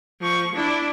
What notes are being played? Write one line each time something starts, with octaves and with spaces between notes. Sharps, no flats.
F3 C#6
D4 E4